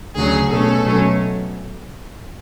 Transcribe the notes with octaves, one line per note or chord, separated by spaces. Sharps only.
D2 C#3 F#3 C#4 G#4
B2 A3 C#4 A4
B2 F#3 A3 C#4